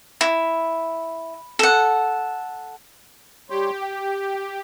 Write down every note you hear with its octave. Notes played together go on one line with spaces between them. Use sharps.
E4
A4 F#5
G3 G4 C#5 C6
G5